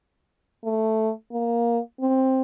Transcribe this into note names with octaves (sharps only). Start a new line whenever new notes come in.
A3
A#3
C4